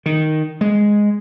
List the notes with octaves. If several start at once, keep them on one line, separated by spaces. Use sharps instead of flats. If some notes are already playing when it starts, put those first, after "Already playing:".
D#3
G#3